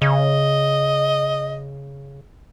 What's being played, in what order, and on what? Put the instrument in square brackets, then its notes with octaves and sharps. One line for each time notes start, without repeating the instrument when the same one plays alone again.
[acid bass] C#3 [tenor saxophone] D#5